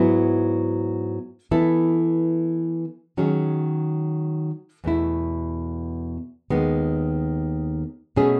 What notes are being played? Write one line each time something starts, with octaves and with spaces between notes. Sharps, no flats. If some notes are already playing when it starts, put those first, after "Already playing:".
Already playing: G#2 F#3 B3 E4
E3 B3 E4 A4
D#3 F#3 C#4 G#4
E2 B2 A3 E4
D#2 D#3 G#3 B3
B2 A3 C#4 G#4